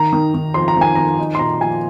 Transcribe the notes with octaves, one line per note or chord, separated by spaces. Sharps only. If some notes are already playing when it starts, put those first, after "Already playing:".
Already playing: D#3 A#5
D#3
D#3
F2 C6
A#5
D#3 G#5
D#3 A#5
D#4
C6
A#2 A#5
F3 G#5